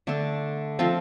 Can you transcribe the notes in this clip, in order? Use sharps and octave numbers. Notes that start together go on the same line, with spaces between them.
D3 A3 D4 A4
F3 C4 F4 A4